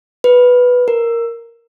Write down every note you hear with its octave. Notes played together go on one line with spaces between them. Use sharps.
B4
A#4